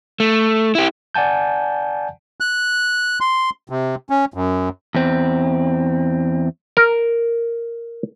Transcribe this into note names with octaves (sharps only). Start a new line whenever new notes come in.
A3
E4 G4
D5 F#5 G#5 A5 G6
F#6
C6
C3
C#4
F#2
E2 C4
A#4